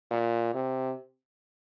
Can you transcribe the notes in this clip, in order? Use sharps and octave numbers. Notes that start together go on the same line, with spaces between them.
A#2
C3